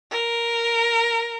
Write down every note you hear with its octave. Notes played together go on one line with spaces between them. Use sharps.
A#4